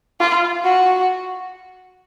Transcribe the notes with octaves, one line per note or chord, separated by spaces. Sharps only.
F4
F#4